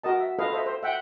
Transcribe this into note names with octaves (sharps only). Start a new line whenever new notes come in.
F#4 A#4 D#5 A5
E5
F4 A4 B4 D#5 F5
A4 C5 D#5 E5
C5
E5 F#5 G5